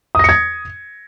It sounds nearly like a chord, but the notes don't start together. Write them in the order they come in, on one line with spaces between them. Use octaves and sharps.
D#6 A#6 C#7 G#6